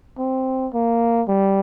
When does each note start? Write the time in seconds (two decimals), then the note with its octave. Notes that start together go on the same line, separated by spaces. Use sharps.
0.19 C4
0.74 A#3
1.28 G3